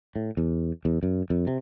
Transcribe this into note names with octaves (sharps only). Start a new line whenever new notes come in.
A2
E2
E2
F#2
F2
C3